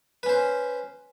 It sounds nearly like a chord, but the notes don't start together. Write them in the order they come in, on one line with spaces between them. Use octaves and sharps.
B4 C#4 C5